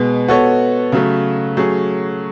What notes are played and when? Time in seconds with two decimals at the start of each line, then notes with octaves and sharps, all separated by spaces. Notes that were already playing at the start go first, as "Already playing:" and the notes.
Already playing: B2 G#3 B3
0.28 B3 F#4 A4 C#5
0.92 C#3 F#3 A3
1.57 F#3 A3 C#4 G#4